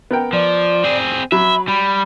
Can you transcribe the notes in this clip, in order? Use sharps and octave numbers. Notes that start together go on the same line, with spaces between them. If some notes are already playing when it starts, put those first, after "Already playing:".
B3 A#4 G5
F3 D5
C4 G#4
F#3 E5 B5
G3 B5